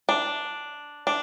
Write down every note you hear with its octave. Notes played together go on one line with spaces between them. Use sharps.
D4
D4